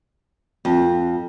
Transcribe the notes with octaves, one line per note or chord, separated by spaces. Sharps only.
F2